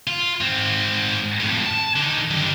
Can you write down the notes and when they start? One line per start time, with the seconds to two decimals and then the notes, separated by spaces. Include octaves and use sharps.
0.07 F4
0.41 G#2 C4
1.40 F2 A2
1.66 A5
1.96 D3 D#4
2.31 G2 D3